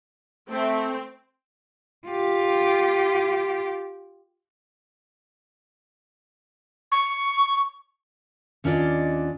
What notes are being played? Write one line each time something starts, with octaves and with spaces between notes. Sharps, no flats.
A3 C4
F4 G4
C#6
D#2 C#4 D4 F4 D5 D#5